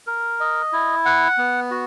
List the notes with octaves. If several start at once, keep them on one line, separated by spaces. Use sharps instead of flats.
A#4
D#5
E4
F#5
B3
F#4